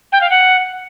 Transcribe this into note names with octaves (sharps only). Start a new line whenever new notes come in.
G5
F5
F#5